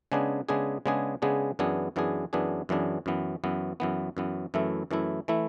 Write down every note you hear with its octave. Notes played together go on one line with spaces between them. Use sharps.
C#3 G#3 B3 D4 G#4
C#3 G#3 B3 D4 G#4
C#3 G#3 B3 D4 G#4
C#3 G#3 B3 D4 G#4
F#2 E3 B3 D4 G#4
F#2 E3 B3 D4 G#4
F#2 E3 B3 D4 G#4
F#2 E3 B3 D4 G#4
F#2 E3 B3
F#2 E3 B3
F#2 E3 B3
F#2 E3 B3
F#2 E3 A3 E4
F#2 E3 A3 E4
E3 A3 E4